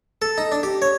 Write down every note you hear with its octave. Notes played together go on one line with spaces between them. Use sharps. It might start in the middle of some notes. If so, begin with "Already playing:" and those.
A4
D#4
D4
G4
C#5